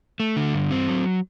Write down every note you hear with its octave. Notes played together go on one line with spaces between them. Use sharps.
A3
D3
G2
C4
F#3